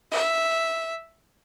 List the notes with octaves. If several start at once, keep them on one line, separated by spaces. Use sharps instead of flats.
E5